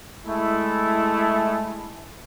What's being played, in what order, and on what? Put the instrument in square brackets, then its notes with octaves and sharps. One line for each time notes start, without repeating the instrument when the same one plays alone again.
[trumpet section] G#3 A3 E4